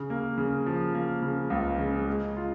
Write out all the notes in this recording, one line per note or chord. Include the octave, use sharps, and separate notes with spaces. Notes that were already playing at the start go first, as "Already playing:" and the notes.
Already playing: C#3
A#3
C#3
F3
A#3
C#3
C#2
C#3
G#3
F4